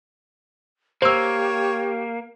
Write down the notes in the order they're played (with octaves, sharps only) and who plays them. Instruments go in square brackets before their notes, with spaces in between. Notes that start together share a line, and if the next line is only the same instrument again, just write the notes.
[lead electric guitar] A#3 [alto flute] G4 [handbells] C5 E6 [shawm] C#5